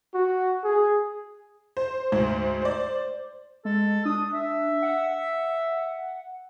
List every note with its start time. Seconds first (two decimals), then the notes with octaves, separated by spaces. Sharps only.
0.14 F#4
0.64 G#4
1.77 C5
2.12 D2 G#2 C5
2.62 C5 D5
3.65 G#3 A4
4.05 D4 D#6
4.33 E5
4.82 F#5